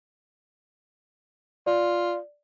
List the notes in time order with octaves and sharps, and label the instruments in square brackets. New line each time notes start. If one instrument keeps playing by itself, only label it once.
[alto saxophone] F4 [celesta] D5